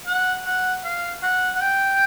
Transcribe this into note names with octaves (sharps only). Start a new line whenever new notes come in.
F#5
F#5
F5
F#5
F#5
G5